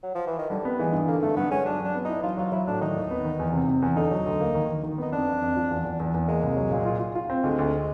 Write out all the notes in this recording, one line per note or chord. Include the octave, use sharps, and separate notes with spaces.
F#3
F3
E3
D#3
D3 G3
B3
E3 G#3
G2
D3 A#3
G2 A3
G2 B3
G#3 C#4
F#3 D4
F#3 D4
B3
D#4 E4
F#3 F4
F#3 F4
F#3 E4
A2 D4
D#3 D#4
D#2
B3
D#3
E2
C3
C3
E2
D3 D#4
F#3
D2
A#3
D#3
D#3
D#3
B3 D#4
F2 D4
F2
F2
F3
E2
E2
E2
E2
G#3 A#3
C2
F#3
A#2
F4
F4
F4
C4
D2 G#3
D2